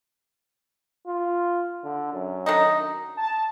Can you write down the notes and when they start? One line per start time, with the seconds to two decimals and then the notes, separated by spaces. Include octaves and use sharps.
1.07 F4
1.84 D3
2.13 F#2
2.46 D#3 D4 D#4
3.17 A5